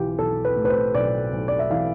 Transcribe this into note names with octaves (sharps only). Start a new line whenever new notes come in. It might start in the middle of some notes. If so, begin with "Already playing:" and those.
Already playing: B1 E3 F4 G4
B1 A4
B4
A2
B4
C5
B1 D5
B1
D5
E5
E3 F5